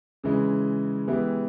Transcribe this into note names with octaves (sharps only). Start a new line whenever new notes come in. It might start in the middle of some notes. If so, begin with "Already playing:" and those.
C#3 E3 G#3
E3 G#3 B3 E4 G4